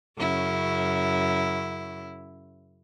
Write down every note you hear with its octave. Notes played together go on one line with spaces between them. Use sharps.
F#2 C#3 E4